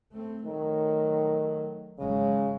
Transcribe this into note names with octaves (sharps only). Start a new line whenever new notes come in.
A3 C4
D#3 F#3 A3
G#1 C#3 F#3 G#3